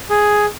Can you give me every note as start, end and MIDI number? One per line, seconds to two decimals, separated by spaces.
0.10 0.46 68